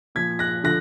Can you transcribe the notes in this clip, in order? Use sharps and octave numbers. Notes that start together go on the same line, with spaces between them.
A#2 F3 G#6 B6
F#6 A#6
D3 F3 F#6 A#6